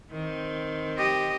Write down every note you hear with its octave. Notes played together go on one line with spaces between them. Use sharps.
D#3 C4
G4 D#5